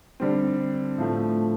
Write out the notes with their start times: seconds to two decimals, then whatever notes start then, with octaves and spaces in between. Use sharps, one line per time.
0.20 D3 G3 C4
0.98 A2 F3 A3